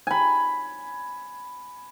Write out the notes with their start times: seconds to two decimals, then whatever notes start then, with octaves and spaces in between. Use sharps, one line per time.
0.07 G#5 B5